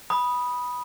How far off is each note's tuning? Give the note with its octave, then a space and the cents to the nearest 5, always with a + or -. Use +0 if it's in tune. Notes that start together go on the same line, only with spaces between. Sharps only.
B5 -10 D#6 +0